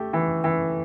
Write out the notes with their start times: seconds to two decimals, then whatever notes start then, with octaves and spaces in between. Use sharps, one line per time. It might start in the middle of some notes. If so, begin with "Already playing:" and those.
Already playing: A3 G4
0.13 E3
0.44 E3